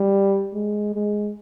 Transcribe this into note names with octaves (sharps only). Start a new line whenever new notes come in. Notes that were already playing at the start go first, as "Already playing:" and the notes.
Already playing: G3
G#3
G#3